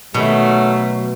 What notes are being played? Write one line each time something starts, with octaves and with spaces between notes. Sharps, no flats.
B2 D#3 F#3 A3